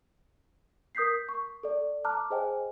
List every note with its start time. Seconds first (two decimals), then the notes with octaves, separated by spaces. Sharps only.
0.95 A#4 D#6 G6 B6 C7
1.29 C#6
1.63 A4 D5
2.04 A5 A#5 D6 F6 F#6
2.30 G#4 C5 D#5 G5 G#5